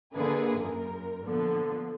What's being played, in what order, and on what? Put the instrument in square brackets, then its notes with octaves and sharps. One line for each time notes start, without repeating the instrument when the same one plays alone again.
[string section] D3 A#3 E4 G#4 B4
F#2 A#4
A#2 D3 F3 B3